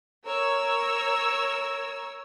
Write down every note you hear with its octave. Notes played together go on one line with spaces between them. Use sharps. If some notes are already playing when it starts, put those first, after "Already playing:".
A#4 C#5 E6